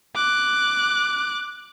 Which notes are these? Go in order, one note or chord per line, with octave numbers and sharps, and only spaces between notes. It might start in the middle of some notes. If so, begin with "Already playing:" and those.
D6 F#6